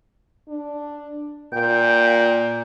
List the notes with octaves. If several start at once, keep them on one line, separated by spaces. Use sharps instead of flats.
D4
A#2 G5